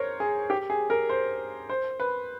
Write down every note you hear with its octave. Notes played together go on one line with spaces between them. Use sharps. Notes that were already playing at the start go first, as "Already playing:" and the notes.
Already playing: A#4 C5 C#5
G#4
G4
G#4
A#4
C5
C5
B4